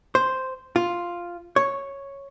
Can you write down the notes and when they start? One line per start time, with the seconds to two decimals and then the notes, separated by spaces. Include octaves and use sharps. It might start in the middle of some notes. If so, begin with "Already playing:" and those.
0.15 C5
0.76 F4
1.56 C#5